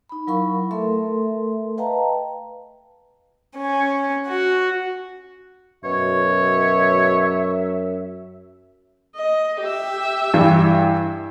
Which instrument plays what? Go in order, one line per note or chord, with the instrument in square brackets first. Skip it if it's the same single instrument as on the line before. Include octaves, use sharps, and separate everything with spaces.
[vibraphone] D#4 B5
F#3 E4 A#4 F5 B5 C#6
A3 A4 A#4 E5 C6
B4 D#5 F5 G5 A5 A#5
[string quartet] C#4
F#4
[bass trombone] F#2 [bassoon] B2 [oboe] C#5 [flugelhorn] E5
[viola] D#5
G4 E5
[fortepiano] G2 E3